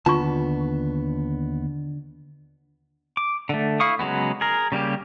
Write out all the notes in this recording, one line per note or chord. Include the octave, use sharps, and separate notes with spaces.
D#2 D3 B3 D4 F4 A5 C#6
D6
D3 A3
E4 F5 C#6 D#6
C#3 F#3 G#3 B3
G#4 A#4
C#3 G3 A#3 G4